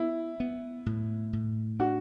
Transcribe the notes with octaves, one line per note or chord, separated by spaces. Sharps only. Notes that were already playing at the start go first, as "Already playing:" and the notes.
Already playing: B3 E4
B3
A2
A2
D4 F#4